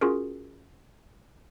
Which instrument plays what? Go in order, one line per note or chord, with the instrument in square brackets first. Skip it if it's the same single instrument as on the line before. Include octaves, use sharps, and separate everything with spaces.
[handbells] C#4 F4 F#4 G#4 A#4